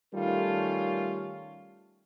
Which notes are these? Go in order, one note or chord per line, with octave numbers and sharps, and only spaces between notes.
D#3 G3 A3 C#4 F4 A4